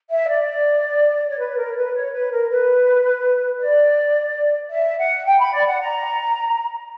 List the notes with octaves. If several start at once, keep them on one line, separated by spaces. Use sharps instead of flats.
E5
D5
C#5
B4
A#4
C#5
B4
C#5
B4
A#4
B4
D5
E5
F#5
G5
B5
D5
F#5
A#5